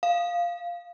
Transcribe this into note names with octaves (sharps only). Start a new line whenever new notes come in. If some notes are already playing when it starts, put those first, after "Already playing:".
F5